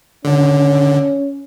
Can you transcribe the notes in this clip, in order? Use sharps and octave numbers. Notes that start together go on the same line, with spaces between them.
D3 C#4